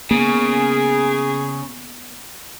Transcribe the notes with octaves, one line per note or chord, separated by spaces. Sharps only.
C#3 A#3 B3 G#4